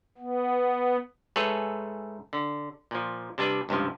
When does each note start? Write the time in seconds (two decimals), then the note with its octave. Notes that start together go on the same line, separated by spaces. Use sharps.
0.18 B3
1.36 G#2 A3 G#4 A4 B4 C#5
2.33 D3
2.91 A#2 F3
3.38 C3 G3 D4 B4
3.69 C#2 G2 C3 F3